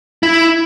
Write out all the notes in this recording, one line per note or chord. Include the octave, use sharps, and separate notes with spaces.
E4